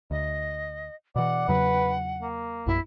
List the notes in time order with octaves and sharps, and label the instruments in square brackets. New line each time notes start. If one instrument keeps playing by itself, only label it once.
[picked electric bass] D2 [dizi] D#5
[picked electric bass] B2 E3 [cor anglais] D5 [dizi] F#5
[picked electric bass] E2 C#3 F#3 [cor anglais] B4
[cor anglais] A#3
[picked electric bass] A#1 F#2 [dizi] E4